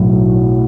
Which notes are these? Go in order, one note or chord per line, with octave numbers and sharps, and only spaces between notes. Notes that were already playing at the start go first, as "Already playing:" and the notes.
Already playing: B1 A2 F#3